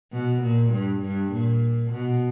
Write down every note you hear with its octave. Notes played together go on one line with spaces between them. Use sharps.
B2
A#2
G2
G2
A#2
B2